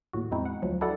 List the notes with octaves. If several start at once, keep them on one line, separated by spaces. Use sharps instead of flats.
D#2 A2 F#4
E2 G#3 C4 D#4 E4
F#5
D2 F3 F#3
D4 E4 F#4 A4 D5 F#5